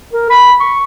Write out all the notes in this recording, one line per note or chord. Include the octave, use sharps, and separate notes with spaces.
A#4
B5
C#6